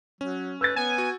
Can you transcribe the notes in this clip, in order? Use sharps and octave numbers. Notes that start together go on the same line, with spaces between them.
F#3 C#4
B4 E6 G6 A6
B3 G#5
F#4